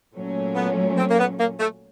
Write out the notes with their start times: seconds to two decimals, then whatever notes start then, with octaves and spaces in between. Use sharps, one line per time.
0.14 A#2 F#3 A3 C#4
0.56 B3
0.98 C4
1.09 A#3
1.19 B3
1.39 A#3
1.60 A3